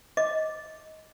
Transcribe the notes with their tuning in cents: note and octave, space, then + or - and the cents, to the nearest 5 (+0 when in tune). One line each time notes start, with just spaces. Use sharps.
D#5 +15 D6 +0